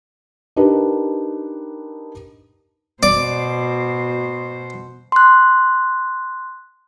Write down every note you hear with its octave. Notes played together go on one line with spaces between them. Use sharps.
D4 D#4 G4 A#4 B4
B2 C5 D5
C6 F#6